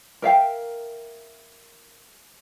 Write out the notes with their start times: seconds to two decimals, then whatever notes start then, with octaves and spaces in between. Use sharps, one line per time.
0.22 A#4 E5 F5 G5